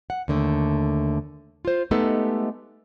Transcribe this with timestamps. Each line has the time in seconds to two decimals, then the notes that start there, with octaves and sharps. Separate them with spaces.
0.10 F#5
0.28 D#2 D3 A3
1.65 F4 C5
1.91 G#3 A3 B3 D#4 G4 A4